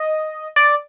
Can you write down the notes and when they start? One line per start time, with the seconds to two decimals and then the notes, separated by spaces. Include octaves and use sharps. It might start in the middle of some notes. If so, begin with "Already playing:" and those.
Already playing: D#5
0.56 D5